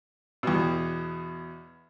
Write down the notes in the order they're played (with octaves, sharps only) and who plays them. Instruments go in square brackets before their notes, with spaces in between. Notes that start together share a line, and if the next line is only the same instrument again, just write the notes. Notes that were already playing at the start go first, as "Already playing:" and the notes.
[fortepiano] E2 B2